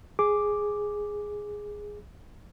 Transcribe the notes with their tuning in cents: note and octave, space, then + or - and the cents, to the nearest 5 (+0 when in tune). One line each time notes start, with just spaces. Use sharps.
G#4 +0 D6 +0